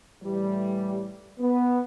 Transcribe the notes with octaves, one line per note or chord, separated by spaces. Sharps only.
A2 E3 G3
B3